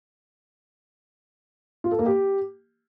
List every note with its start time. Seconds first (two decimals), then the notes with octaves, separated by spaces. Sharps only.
1.84 F4
1.91 A4
1.99 A#3
2.06 G4